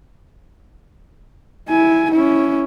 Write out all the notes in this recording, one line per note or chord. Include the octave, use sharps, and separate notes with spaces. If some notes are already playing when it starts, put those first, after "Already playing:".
E4 G#5
C#4 E4